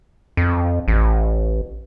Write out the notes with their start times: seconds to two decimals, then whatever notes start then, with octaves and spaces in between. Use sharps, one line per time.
0.37 F2
0.88 A1